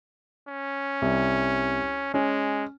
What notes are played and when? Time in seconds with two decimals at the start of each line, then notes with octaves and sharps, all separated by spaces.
0.48 C#4
1.02 C2
2.14 G#3 C#4